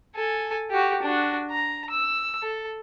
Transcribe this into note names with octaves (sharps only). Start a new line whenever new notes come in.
A4 G#5
F#4 G4
D4 F#4
A#5
E6
A4